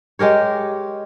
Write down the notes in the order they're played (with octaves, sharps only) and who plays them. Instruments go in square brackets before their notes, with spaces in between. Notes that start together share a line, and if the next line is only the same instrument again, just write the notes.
[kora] G#3 G4 A#4 C#5